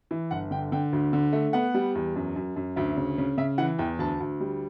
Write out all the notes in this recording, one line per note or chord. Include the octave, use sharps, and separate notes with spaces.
E3
G1 F#5
D3 G5
D3 G5
D2
D3
A3
B3 F#5
G3
E2
F#2
F#2
F#2
D2 E5
C#3
C#3
C#3 E5
E3 F#5
E2 G5
D2 A5
D2
G3